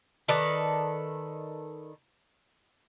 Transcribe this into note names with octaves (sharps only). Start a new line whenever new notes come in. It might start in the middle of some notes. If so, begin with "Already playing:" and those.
D#3 A4 B4 D5